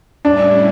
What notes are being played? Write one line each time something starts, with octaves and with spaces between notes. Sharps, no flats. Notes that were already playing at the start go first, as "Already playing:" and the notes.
A2 G3 C#4 D4 E4